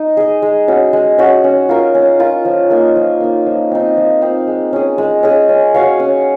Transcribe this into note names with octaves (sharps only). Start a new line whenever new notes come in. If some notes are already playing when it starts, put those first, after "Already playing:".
Already playing: D#4
G#4 D#5
G#3
C#4 F#4
G#3
C#4 F#4
C#4
F4 A#4
C#4
F4 A#4
F3
A#3 D#4
F3
A#3 D#4
F3
C4 D#4
F3
C4 D#4
G#3
C#4 G#4
G#3
C#4 G#4
C#4
F#4 C#5 F5
C#4